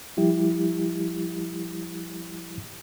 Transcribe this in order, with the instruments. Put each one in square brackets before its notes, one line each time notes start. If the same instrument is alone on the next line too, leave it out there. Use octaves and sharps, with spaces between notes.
[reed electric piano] F3 G3 E4 G4